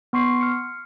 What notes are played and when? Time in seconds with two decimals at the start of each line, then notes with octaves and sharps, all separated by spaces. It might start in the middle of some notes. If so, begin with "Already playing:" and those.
0.13 B3 C6 C#6 C7
0.41 F6 C#7